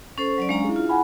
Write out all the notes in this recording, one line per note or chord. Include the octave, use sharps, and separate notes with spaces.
C#4 A4 C5
F#3 C#4 D5
G#3 C#4 D4 F5 A#5
E4 G#4
F4
F#5 G#5 B5